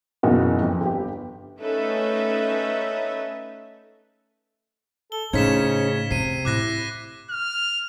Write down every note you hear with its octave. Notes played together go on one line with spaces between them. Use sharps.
F#1 B2 D#3 E3 F#4
F2
G1 G4
A3 C#4 D#4 A4 B4 E5
A4 G7
A2 C#3 C#4 D#4 C5 G#6 B6 E7
C3 C4 C#4 C7 D#7
A2 E4 D6 F#6 A#6
F6